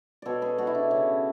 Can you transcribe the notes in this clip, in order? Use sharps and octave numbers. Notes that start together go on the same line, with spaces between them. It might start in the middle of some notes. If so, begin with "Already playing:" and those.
B2 A4 C#5 D5
G#4 B4
B2 F#4 A4
E4
D4
C#3 C#4